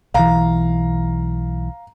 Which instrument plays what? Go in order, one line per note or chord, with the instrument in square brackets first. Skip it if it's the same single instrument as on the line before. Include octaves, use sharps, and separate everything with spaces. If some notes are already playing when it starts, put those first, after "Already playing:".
[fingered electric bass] B1 E3 [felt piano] F5 A#5